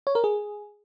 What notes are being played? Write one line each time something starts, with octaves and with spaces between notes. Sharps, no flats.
C#5
A#4
G#4